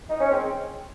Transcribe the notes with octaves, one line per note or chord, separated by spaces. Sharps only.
D#4
C#4
D#3 G#3 C4